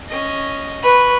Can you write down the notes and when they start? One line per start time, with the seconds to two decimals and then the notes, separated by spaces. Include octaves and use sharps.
0.11 C#4 D#5
0.83 B4 C#6 F#6